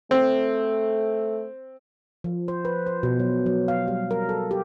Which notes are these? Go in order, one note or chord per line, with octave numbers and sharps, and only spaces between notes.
A3 C4
F3
C5
B4
C5
B2
F#3
F#3
F5
G3
A#4
A4
G4